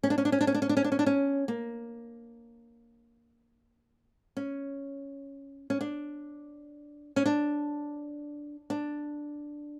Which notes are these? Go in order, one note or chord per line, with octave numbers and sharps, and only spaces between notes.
C#4
D4
C#4
D4
C#4
D4
C#4
D4
C#4
D4
C#4
D4
C#4
D4
C#4
A#3
C#4
C#4
D4
C#4
D4
D4